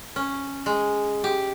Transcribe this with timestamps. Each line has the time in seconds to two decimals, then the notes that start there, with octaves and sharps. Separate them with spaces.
0.16 C#4
0.66 G#3
1.24 G4